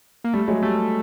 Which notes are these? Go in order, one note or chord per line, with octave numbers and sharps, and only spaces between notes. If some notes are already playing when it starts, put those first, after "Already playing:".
A#3
G3 A3
F#3 G#3
G3 A3